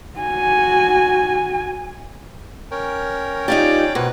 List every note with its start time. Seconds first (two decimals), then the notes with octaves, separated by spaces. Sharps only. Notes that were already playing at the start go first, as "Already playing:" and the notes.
0.18 F#4 G#5
2.71 C#4 A#4 C#5 G5
3.48 D#4 F4 G4 D5
3.95 B2 C4 A#4 B4 C#5